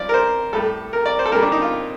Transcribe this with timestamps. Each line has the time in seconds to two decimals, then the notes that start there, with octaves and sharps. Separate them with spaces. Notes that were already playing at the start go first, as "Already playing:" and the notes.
Already playing: G2 F3 D5
0.09 A#4
0.14 C5
0.53 A2 G3 A4
0.93 A#4
1.06 D5
1.19 C5
1.26 A4
1.32 A#2 A#4
1.35 G3
1.42 D4
1.52 D#4
1.62 F4